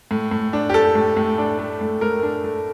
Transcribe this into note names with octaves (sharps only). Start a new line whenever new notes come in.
A2
A2
D4
G4
A3 A4
A2
A2
D4
A3
A2
A2 A#4
D4
A3